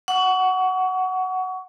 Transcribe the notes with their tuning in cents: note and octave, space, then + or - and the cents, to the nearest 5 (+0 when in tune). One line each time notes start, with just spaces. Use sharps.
F#5 +5 C#6 +30